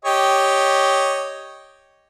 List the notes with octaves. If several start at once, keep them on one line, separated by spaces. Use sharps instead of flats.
G4 C#5 D#5